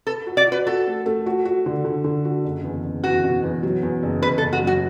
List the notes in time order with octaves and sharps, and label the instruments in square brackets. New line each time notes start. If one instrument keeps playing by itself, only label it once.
[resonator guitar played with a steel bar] A4 [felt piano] B4
[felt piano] F#4
[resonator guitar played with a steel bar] D5
[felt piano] F#4 [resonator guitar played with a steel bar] B4
[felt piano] F#4 [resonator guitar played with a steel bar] A4
[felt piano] A3
A3
F#4
F#4
D3
D3
D3
F#4
F#1
E2
F#1
[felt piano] E2 [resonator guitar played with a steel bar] F#4
[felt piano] B2
E2
F#3
E2
F#1
[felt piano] F#1 [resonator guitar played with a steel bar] B4
[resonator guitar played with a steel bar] A4
[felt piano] F#1
[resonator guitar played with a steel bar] F#4
[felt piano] F#3 [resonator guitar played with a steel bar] F#4